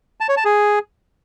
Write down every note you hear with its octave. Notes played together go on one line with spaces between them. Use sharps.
A5
C#5
A5
G#4